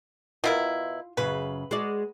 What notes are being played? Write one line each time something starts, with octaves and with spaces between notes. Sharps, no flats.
B2 E4 F4 A#4
F#2 C#3 F4 B4
G#3 F#4 D5